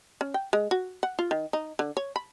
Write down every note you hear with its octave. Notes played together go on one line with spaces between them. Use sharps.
C#4
G5
G#3
F#4
F#5
F4
D#3
D#4
D3
C#5
B5